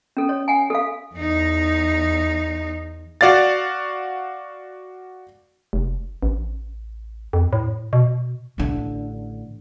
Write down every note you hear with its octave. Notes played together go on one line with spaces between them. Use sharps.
C#4 A4
C#5
F#5 G#5
A4 F5
E2 D#4
F#4 D5 F5 A6
F1
A1
F2
A2
B2
A1 D3